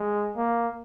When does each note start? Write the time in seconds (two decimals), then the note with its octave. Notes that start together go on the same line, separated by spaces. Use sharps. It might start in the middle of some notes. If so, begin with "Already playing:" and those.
Already playing: G#3
0.36 A#3